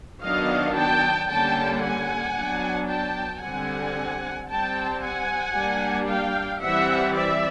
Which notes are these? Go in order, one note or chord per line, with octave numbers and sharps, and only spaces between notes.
D#3 F#3 B3 D4 D#5 F5
G5 A5
D3 G3 A#3 C#4 G5 A5
F#5 G#5
F#3 B3 D4
G5 A5
D3 G3 C4 F#5 G#5
G3 C4 G5 A5
F#5 G#5
G3 A#3 D4
F5 G5
E3 G3 C4 E5 F#5
D5 E5